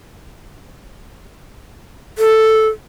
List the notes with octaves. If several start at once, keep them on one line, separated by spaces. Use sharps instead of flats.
A4